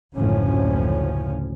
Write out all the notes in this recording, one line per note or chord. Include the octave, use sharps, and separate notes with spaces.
F#1 D2 A2 F3 C#4